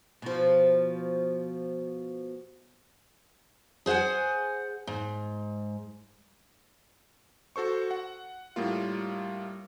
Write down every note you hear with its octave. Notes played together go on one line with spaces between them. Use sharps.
B2 F3
G#4 C5 F5 F#5 G#5
G#2
F#4 A4 C5 C#6
F#5
A2 G3 A#3 F4